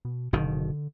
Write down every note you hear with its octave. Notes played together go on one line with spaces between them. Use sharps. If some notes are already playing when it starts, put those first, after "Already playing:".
B2
F#1 B2 D3 D#3